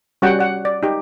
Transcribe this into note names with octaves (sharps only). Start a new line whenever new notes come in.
G3 C#4 F#4 F#5 G5
D5 F#5
D5
D#4 G4